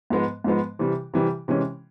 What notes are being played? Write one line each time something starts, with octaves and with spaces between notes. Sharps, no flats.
G#2 F3 G#3 B3
G#2 F3 G#3 B3
C3 E3 G3
C3 E3 G3
C3 E3 G#3 C#4